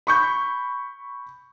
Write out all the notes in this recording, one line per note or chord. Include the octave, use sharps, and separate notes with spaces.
B5 C#6 G6